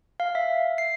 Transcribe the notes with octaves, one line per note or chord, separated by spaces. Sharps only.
F5
E5
C7